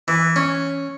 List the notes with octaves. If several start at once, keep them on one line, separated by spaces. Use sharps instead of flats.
E3
C#4